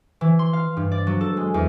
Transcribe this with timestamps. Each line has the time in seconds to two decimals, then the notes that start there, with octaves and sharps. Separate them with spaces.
0.21 E3
0.39 C6
0.53 F5
0.77 G2
0.92 D5
1.07 F#3
1.21 A4
1.37 G#3
1.54 E2